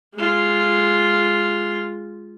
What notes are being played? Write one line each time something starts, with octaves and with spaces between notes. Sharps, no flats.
G#3 F4